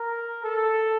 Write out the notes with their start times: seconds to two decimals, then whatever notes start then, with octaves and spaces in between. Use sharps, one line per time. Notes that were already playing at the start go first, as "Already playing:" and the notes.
Already playing: A#4
0.44 A4